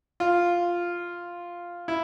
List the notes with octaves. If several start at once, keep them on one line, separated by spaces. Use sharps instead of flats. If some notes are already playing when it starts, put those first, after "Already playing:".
F4
E4